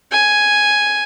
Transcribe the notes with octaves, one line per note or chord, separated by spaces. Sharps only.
G#5